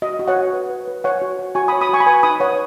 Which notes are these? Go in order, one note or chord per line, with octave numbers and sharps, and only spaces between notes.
F#4 D#5
F#4
C#5 F#5
F#4
B4
B4
B4
C#5 F#5
F#4
C#5
F#4 G#5 C#6
B5 D#6
C#5
B5 D#6
F#4 G#5 C#6
B5
B4 G#5 C#6
D#4 B5 D#6
B4 C#5 F#5